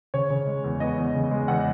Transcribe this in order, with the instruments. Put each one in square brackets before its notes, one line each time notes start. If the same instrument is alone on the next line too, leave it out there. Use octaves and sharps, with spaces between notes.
[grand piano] C#3 C#5
C#3
G#3
E2
B3 D#5
E2
C#3
G#3
E2 F#5